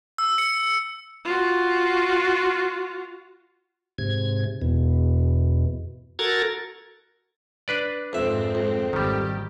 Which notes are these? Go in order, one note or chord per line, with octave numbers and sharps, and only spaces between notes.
E6
C#7
F4 F#4
G#2 C3 G#6
E2 B2
F#4 A4 A#4 A#5 G#6 A6
D4 B4 D5
F2 G#2 C4 E5
F2
G#1 D#3 G3 G4